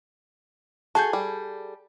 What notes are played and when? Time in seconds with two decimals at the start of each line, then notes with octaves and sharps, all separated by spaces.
0.95 F#4 G#4 A4 A5 G6
1.13 G3